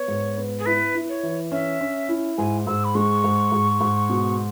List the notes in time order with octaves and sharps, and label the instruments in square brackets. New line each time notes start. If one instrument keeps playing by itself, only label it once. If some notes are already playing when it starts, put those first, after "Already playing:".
Already playing: [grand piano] B3 [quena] C#5
[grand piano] G#2
B3
[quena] G#4
[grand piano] E4 [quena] B4
[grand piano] E4
[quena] C#5
[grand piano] E3
[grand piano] C#4 [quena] E5
[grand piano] C#4
E4
[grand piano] G#2 [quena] G#5
[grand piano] G#2 [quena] E6
[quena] B5
[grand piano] G#3 [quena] C#6
[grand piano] G#2
G#2
G#2
B2